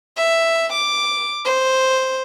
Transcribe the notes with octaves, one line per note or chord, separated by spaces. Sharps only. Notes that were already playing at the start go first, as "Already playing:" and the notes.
E5
D6
C5